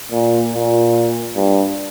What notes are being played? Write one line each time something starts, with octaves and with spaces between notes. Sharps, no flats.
A#2
A#2
G2